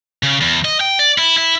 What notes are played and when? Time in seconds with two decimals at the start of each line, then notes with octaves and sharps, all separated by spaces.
0.23 C#3
0.41 E2
0.65 D#5
0.81 G5
0.99 D5
1.18 E4
1.37 E4